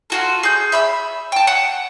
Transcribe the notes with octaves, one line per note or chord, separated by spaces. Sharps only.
F4 F#4 A4
G#4 G6
E5 B5 E6
G5 A5
F#5